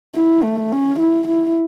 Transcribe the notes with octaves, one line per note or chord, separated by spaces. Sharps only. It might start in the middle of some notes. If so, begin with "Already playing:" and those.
E4
A3
C#4
E4
E4